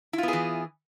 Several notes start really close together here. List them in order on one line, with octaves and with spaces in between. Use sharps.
E4 F4 B3 G#4 E3